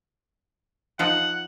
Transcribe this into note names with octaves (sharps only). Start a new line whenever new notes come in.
F3 D#4 F4 F#5